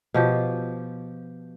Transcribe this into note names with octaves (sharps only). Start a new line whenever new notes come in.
B2 F3 G4